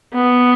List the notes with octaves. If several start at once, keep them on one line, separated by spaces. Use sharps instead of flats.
B3